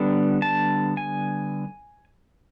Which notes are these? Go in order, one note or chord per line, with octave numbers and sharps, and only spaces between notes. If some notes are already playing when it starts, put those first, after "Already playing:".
Already playing: D3 G3 B3 D4
A5
G#5